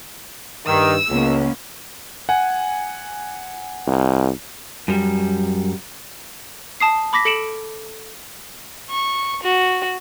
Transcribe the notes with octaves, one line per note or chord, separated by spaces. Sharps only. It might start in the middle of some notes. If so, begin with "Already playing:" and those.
G2 D#3 E6
C#2 A#3 B3 C#4
F#5 G#5
C2
F#2 G3
A5 D#6 C7
B5 D6 A#6 B6
A4 C#7 D7 E7 F#7
C#6
F#4